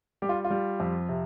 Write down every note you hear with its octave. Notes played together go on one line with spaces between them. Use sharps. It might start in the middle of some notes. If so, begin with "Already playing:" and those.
G3 G4
F4
F4
G3
F2
C3